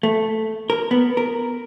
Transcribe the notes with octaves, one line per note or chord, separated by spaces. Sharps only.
A3
A#4
B3
A#4